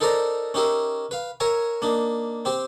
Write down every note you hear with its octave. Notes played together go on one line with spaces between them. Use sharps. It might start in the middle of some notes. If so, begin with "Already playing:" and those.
D#4 A4 A#4 C5 D5 A#5
C#4 D#4 G4 A#4 E5
B4 F5
A#4 C#5 E5 G#5 A#5
A#3 D4 D#4
C4 G4 C5